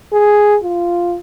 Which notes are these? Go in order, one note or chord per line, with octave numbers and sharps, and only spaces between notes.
G#4
F4